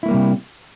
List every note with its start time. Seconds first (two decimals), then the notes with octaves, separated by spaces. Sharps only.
0.03 E4
0.06 A3
0.08 A#3
0.11 G3
0.14 C3